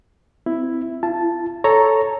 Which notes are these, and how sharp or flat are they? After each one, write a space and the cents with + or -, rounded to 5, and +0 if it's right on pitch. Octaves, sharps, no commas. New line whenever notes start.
C4 -20 E4 +0
F4 -45 A5 -5
A4 -5 C#5 +0 A#5 +0